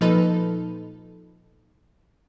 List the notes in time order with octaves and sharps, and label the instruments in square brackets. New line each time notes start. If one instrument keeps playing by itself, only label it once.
[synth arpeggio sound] A#2 F3 D#4 A4 B4